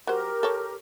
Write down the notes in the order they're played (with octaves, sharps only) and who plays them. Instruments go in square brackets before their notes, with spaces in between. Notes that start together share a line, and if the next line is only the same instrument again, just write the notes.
[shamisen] F#3 C5 [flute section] G4 A#4
[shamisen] A4 C#5